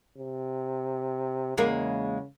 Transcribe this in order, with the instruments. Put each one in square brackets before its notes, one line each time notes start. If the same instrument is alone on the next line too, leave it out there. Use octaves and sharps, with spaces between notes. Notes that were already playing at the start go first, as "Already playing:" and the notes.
[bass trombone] C3
[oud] E2 G#3 A#3 [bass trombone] C#3